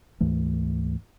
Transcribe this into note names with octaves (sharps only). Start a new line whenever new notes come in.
D2 G#2 E3 A3